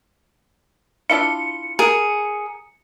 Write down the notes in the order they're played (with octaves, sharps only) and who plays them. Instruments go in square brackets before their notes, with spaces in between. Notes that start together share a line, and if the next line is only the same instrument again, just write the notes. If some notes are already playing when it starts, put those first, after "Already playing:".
[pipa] D4 E4 F4 [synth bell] C#7
[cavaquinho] G#4 [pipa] A#4